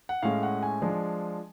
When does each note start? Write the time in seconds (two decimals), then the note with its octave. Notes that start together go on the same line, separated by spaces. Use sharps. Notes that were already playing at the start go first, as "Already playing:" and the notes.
0.09 F#5
0.23 A2 G#3 C#4 F5
0.43 F#5
0.63 G#5
0.82 F3 G#3 D4